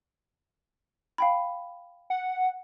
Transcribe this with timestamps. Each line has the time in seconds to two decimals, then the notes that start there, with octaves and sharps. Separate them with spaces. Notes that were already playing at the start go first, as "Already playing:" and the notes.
1.18 F5 G5 B5
2.10 F#5